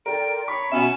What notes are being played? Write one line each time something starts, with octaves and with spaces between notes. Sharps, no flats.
A4 A#4 D5 G5 C6 D7
C#5 A#5 B5 C#6 B6
B2 B3 C#4 E5 G#5 E7